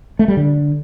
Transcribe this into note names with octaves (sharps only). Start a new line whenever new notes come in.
A3
G3
D3